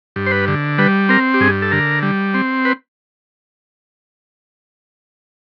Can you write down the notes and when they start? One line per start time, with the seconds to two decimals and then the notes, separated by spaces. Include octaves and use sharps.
0.16 G2
0.26 C5
0.31 B4
0.48 D3
0.78 G3 B4
1.09 C4 A#4
1.34 G4
1.40 G2 G#4
1.62 A4
1.71 D3 A#4
2.03 G3
2.34 C4
2.65 B4